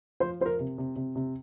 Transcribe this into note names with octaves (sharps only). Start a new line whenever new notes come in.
F3 C5
F3 C5
A#4
C3
C3
C3
C3